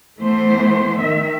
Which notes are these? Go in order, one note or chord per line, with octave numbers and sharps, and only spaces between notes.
E3 A3 B3 C5
D#3 E5